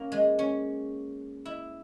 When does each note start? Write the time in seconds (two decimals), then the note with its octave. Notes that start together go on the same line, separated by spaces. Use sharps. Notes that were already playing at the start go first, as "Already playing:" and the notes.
Already playing: A#3 C#4
0.12 G#3
0.39 C#4
1.45 E4